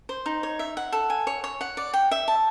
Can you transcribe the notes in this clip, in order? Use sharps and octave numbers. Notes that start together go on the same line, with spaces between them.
C5
D#4
C#5
E5
F#5
A4
G#5
C#5
C#5
F#5
D5
G5
E5
A5